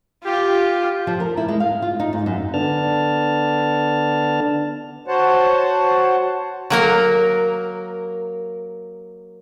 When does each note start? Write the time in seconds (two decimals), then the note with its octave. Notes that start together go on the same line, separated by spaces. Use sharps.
0.25 F4 G4
1.07 F3
1.20 A#4
1.37 E4
1.48 G#3
1.60 F5
1.82 F4
2.00 D#4
2.13 G#2
2.26 F#2
2.54 D3 B3 D4 A5 F6
5.08 F#4 C5 C#5 F#5 A5
6.70 F#3 A#3 A#4